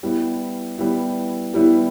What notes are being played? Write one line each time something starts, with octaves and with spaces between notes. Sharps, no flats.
G3 B3 E4
G3 B3 E4
G3 B3 E4